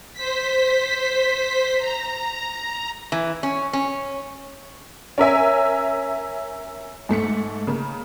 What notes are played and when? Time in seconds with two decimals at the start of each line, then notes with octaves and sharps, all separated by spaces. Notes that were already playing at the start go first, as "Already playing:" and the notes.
0.13 C5 B6
1.79 A#5
3.12 E3
3.43 C#4
3.73 C#4
5.18 C#4 A#4 E5 G#5
7.09 G#2 A3 B6 C#7
7.67 C#3 A#3